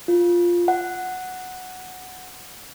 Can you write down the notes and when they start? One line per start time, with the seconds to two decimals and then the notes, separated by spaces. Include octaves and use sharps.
0.08 F4
0.68 F#5